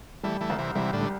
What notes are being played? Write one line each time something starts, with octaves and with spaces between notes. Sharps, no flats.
E3 G3 A3
E3 A3
C2
C3 E3
C3 E3 G3
A2 D3
G3